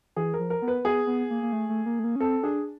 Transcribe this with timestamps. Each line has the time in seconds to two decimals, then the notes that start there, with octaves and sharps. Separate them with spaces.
0.16 E3 G#4
0.34 A#4
0.39 F3
0.50 A#4
0.62 B3
0.68 B4
0.84 B3 G#4
1.07 B3
1.30 A#3
1.43 A#3
1.53 A3
1.69 A3
1.86 A#3
1.99 A3
2.04 A#3
2.16 C#4
2.20 C4 A4
2.43 D4 G#4